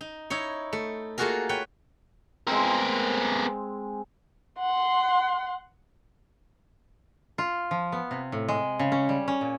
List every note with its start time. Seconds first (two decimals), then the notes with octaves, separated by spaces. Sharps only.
0.01 D#4
0.30 D#4 E4 C#5
0.73 A3
1.18 A3 A#3 F4 F#4 G#4 A#4
1.49 B4 C#5 G5
2.47 G#3 B3 C4 A#4
4.59 F#5 C6
7.38 F4
7.71 F3
7.92 B3
8.11 C3
8.32 A2
8.48 G#3
8.79 C#3
8.92 C#4
9.09 G3
9.28 C#4
9.41 A#2